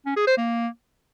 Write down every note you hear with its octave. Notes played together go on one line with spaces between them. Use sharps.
C#4
G#4
C5
A#3